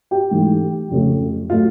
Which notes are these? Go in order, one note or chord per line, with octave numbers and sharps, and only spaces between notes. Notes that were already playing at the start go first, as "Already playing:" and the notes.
G4 G5
G#2 E3 A3
F2 C#3 F3 A3
A2 F#3 A3 F4 F5